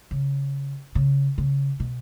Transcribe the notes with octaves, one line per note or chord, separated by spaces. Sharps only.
C#3
C#3
C#3
B2